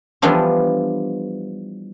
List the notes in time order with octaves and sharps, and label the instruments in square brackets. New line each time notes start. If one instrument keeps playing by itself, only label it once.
[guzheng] E3 F3 G3 B3 D4 F4